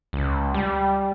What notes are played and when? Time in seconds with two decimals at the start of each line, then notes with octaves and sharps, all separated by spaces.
0.13 C#2
0.54 G3